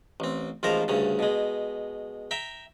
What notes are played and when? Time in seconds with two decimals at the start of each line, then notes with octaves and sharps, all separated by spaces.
0.20 A1 C4
0.63 A1 G#2 F3 A#4 C5 A#5
0.88 D2 G2 C#3
1.19 B2 G#3
2.31 E5 G5 A#5